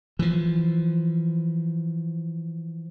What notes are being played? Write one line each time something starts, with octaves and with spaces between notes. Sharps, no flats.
E3 F3